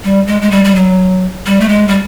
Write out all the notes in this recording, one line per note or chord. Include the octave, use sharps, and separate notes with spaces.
G3
G#3
G#3
G3
G3
F#3
G3
A3
G#3
G3